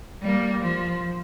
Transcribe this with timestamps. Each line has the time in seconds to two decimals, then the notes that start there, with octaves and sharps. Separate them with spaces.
0.21 G3 A#3
0.62 F3